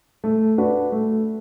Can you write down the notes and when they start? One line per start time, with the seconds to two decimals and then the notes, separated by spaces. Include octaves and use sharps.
0.24 A3
0.58 D4 F#4 B4
0.92 A3